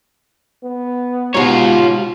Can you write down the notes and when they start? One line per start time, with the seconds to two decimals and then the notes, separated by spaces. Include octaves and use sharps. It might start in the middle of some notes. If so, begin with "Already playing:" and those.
0.63 B3
1.34 G#2 B2 F4 G4 C#5